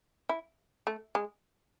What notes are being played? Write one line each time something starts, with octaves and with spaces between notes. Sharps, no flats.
E4
A3
G#3